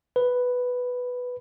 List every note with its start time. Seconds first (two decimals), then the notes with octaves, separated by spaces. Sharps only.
0.16 B4